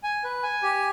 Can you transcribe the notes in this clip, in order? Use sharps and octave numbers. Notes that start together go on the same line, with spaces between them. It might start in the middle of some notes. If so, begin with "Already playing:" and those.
G#5
B4
G#5
G4